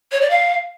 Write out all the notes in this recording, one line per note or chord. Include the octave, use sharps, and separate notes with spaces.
C#5
D5
F5